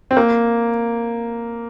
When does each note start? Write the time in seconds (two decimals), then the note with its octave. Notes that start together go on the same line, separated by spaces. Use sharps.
0.11 C4
0.17 A#3